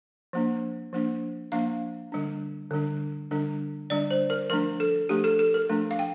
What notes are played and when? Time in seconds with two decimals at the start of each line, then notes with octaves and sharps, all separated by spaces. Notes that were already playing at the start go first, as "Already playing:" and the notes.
0.33 F3 A#3 D4
0.93 F3 A#3 D4
1.52 F3 A#3 D4 F5
2.12 D3 G3 D4
2.71 D3 G3 D4
3.31 D3 G3 D4
3.90 D3 G3 D4 D5
4.11 C5
4.30 A#4
4.50 F3 A3 D4 A#4
4.80 A4
5.09 F3 A3 D4 G4
5.24 A4
5.39 A4
5.54 A#4
5.69 F3 A3 D4
5.91 F5
5.99 G5